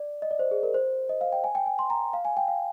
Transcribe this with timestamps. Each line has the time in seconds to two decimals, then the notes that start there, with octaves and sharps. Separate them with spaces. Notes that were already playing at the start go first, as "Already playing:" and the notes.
Already playing: D5
0.22 D#5
0.31 D5
0.39 C5
0.51 G#4
0.63 A#4
0.74 C5
1.09 D#5
1.21 F5
1.32 G5
1.44 G#5
1.55 G5
1.66 G#5
1.79 C6
1.90 A#5
2.13 F5
2.25 G#5
2.37 G5
2.48 F5